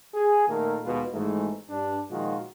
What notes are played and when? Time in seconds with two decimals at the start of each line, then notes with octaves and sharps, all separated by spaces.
0.14 G#4
0.48 A#2 D#3 A3 A#3 A4 A#4
0.84 D#2 B2 G#3 F4 B4
1.13 G#1 G#2 E3 G#3 A3
1.69 G2 D4
2.10 A#2 D#3 F3 G#3 F4 F#4